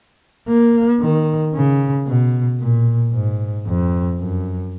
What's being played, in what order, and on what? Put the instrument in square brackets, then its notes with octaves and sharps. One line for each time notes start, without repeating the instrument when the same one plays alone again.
[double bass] A#3
D#3
C#3
B2
A#2
G#2
F2
F#2